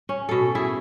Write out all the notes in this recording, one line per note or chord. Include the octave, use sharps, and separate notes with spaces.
C#4
B2 A4
E4 G#4 E5